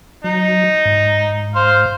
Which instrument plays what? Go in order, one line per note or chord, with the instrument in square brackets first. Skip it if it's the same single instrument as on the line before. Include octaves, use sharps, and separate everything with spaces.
[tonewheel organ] F#3 [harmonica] D#4
[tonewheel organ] G#2
[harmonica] C5 F5